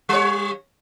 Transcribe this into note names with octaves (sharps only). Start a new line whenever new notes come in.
G3 C#5